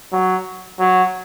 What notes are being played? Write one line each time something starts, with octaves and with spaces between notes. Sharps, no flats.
F#3
F#3